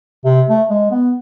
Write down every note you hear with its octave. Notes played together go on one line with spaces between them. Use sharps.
C3
A3
G#3
B3